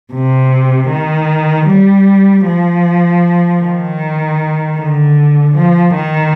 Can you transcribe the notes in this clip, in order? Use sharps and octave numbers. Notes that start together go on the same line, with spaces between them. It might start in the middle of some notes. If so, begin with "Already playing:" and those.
C3
D#3
G3
F3
D#3
D3
F3
D#3